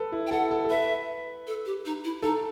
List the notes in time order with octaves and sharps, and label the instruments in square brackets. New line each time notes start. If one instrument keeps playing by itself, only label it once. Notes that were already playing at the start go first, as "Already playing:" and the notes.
Already playing: [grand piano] A4 B4
E4
[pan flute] G5
[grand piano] A4 [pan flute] F#5
[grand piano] A4
A4
[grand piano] B4 [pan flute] E5
[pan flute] A4
G4
D#4
E4
[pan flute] D#4 [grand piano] A4